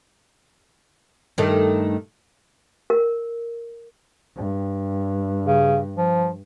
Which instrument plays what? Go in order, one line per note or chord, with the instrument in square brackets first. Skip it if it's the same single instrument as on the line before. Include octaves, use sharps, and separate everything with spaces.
[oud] G2 D#3 A3
[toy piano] A#4
[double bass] G2
[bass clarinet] C#3
F3